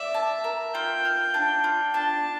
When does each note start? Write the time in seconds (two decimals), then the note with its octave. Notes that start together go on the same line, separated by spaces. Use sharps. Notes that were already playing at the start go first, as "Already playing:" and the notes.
Already playing: D5 E5
0.14 A5
0.44 A#4
0.74 F4 G5
1.05 F5
1.34 D4
1.64 F4
1.94 D4 A5